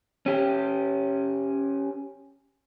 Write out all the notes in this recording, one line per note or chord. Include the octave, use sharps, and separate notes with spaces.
C#4 G4